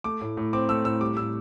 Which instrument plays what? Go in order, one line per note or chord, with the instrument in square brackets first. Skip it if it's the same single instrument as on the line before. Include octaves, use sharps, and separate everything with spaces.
[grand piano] A3 D6
A2
A2
C4 D6
A3 E6
A2 E6
G3 D6
A2 E6